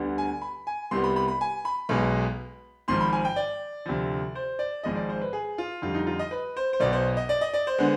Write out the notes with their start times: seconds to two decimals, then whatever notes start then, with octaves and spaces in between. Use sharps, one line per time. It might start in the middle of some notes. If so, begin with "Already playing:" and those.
Already playing: D2 D3 G3 B3
0.18 G#5
0.42 B5
0.67 G#5
0.91 C2 C3 G3 B3 C6
1.04 B5
1.16 B5
1.28 B5
1.41 G#5
1.65 B5
1.89 B1 B2 G#3 B3
2.88 G#1 G#2 F3 C6
3.00 B5
3.13 G#5
3.25 G5
3.36 D5
3.86 D2 C3 F3
4.35 C5
4.59 D5
4.83 G#1 G#2 F3 G#3 D#5
4.96 D5
5.09 C5
5.21 B4
5.33 G#4
5.58 F4
5.82 F2 D3 G3 F4
5.94 D#4
6.07 F4
6.19 D#5
6.31 B4
6.57 C5
6.73 C5
6.80 B1 B2 B3 D5
6.93 C5
7.17 D#5
7.29 D5
7.41 D#5
7.54 D5
7.67 C5
7.78 D3 G#3 B3